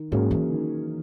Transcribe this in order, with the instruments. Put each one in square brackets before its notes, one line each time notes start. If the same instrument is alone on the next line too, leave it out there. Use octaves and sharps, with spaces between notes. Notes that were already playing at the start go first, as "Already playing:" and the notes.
Already playing: [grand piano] D#3
[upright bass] G#2 [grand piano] F#3 A#3 C#4 G#4
[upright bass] E3
[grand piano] D#3